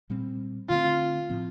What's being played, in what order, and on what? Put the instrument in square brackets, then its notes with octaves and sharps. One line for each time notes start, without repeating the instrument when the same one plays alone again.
[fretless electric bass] A#2 G3 C4
[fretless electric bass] D3 A3 C4 [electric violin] F4
[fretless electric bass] A2 F3 C4